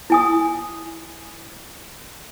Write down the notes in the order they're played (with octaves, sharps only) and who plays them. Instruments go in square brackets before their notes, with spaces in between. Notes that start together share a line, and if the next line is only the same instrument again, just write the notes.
[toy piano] E4 G#5 D#6